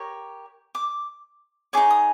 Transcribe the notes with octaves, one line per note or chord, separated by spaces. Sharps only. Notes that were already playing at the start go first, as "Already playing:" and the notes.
Already playing: G4 A#4 C#5
D6
D#4 G#4 C#5 D6
D#6